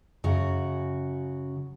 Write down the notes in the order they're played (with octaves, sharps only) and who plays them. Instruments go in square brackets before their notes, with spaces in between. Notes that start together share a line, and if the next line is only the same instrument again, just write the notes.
[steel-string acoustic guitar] F#2 C#3 F#4